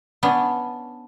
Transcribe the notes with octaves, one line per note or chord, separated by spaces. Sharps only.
B3 C#4 D4